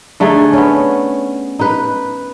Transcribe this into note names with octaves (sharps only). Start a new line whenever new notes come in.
D3 A3 D#4 G#4
B3 C#4
D#4 B4